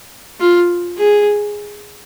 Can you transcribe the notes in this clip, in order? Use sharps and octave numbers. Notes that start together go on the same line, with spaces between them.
F4
G#4